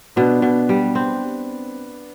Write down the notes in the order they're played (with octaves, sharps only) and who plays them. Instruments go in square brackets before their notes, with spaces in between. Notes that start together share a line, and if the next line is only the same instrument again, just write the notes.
[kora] B2 [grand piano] B3 D4
[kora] B2
G3
C4